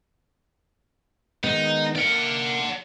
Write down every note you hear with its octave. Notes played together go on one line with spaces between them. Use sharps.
D#3 G#3 B3 D#4
A#3 D5 E5 F#5 F6